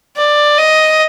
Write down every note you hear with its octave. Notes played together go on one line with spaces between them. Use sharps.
D5
D#5